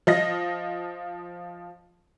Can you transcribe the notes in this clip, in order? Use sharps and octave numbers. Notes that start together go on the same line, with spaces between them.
F3 D#5 A#6